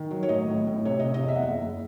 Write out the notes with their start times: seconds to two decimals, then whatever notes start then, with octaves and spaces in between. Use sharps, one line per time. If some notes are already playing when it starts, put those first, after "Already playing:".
Already playing: D#3
0.11 F#3
0.23 C#5
0.29 A1 D#5
0.48 A2
0.67 A2
0.85 C3 C#5
0.99 C3 D#5
1.14 D#5
1.24 E2 E5
1.36 F#5
1.42 F#1 E5
1.61 F#1